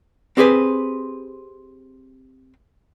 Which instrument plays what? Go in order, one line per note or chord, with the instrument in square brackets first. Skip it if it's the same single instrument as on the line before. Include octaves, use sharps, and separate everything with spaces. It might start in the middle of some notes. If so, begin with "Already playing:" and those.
[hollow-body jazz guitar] C4 G4 G#4 B4 C5